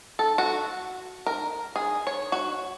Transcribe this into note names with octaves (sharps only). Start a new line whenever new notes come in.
A4
F#4
A#4
G#4
C#5
F#4